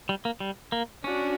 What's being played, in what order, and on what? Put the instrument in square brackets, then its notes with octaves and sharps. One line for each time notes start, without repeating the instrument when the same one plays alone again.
[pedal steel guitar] G3
A#3
G3
A#3
[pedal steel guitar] C#4 [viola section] D4 F#4